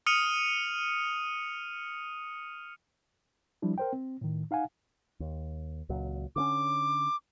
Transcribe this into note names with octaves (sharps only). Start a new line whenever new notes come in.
D#6 F6 C#7 D#7 F7
F3 G3 D4 E4
A#4 C5 G5
C4
A2 D#3
D#4 F5 F#5 G#5
D#2
C#2 A#2 F#3
D3 A#3 C#4 D6